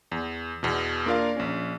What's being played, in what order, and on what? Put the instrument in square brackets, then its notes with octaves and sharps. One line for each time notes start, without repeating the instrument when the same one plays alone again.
[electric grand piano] E2
E2 B2
A#3 D4 F4 A#4 D5 F5
A#1 C#4